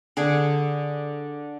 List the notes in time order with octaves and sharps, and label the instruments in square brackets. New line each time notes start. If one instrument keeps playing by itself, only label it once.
[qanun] D3 G#4